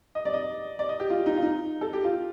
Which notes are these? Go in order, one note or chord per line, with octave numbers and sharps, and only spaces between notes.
D#5
D5
D#5
D5
D#5
G4
F4
D#4
F4
D#4
A4
G4
F4